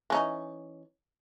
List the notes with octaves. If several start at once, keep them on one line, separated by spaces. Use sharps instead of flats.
E3 C#4 D#4